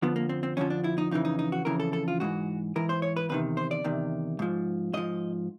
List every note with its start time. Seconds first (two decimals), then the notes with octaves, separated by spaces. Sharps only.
0.02 F2 D3 F3 B3
0.16 A#3
0.29 C4
0.43 C4
0.57 F2 D3 F3 C#4
0.70 D4
0.84 E4
0.98 D#4
1.11 F2 C#3 E3 D#4
1.25 D#4
1.39 D#4
1.52 F#4
1.65 F2 C#3 E3 A#4
1.80 A4
1.93 A4
2.08 F4
2.20 G#2 E3 F#4
2.76 G#2 E3 A#4
2.89 C5
3.02 C#5
3.16 B4
3.29 E2 C3 D#3 B4
3.57 C5
3.71 D5
3.84 E2 C3 D#3
4.39 G#2 F3
4.93 G#2 F3 D#5